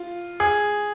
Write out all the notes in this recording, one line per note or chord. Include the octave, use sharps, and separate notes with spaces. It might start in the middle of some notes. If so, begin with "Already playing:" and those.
Already playing: F4
G#4